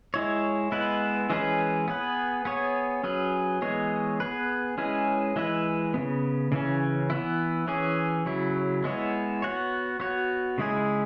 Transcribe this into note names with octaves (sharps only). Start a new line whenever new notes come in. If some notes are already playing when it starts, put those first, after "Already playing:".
G#3 E4 C#5
G#3 B3 E4 B4
E3 G#3 C#4 G#4 B4
B3 G#4 B4
B3 G#4 C#5
F#3 C#4 G#4 B4
E3 G#3 B3 G#4 C#5
B3 G#4 B4
G#3 C#4 E4 G#4 B4
E3 G#3 E4 B4
C#3 G#3 B3
C#3 E3 C#4
E3 B3 E4
E3 C#4 G#4
C#3 F#3 E4
G#3 B3 E4 C#5
B3 F#4 C#5
B3 F#4 C#5
C#3 G#3 E4 G#4